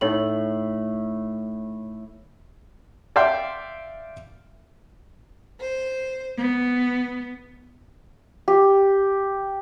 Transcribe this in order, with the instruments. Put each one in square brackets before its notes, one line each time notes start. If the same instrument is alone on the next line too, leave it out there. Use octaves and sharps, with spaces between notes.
[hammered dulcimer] A2 [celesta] D#4 C#5 F#7
[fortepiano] D5 E5 F5 G5 C6
[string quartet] C5
B3
[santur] G4